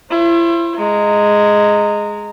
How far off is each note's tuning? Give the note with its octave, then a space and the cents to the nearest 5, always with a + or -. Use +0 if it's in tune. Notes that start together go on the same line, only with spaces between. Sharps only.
E4 +35 C5 +35
G#3 +0 A#5 -15